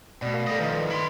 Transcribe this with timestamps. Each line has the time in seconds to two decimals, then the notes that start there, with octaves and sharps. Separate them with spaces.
0.22 B2 A3 D5
0.34 A#4 F5
0.47 G3 A4 D5 D#5
0.60 D#3 F3 B4 D#5
0.90 E4 C6